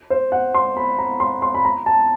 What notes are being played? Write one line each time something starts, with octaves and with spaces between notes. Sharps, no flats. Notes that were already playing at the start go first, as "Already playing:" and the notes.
C5
F#5
C6
B5
A#5
C6
C6
B5
A#5
A5